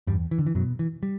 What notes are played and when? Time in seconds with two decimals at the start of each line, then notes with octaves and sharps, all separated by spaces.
0.07 E2 G2 G3
0.31 E3
0.38 D3
0.47 E3
0.55 F#2 B2 F#3
0.79 E3
1.03 G3